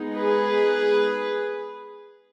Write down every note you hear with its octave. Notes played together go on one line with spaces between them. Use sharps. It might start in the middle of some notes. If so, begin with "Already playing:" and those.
Already playing: G#3 B3 D#4
G#4 B4